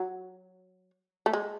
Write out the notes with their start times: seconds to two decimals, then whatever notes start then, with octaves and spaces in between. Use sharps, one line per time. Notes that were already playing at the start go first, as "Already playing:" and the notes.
Already playing: F#3
1.26 A3
1.33 G#3